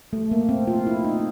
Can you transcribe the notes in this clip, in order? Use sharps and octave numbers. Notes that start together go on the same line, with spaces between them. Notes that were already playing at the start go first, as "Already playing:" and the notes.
A3
A#3
C4
F4
E4
D#4